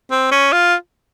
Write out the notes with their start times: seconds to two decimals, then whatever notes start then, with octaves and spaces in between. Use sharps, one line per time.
0.11 C4
0.32 C#4
0.53 F4